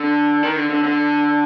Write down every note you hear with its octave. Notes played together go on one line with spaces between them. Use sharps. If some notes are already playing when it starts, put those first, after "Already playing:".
Already playing: D3
D#3
D3
D3
D3